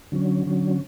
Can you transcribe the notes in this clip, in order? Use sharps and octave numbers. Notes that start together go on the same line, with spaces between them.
D3 F#3 C#4
D3 F#3 C#4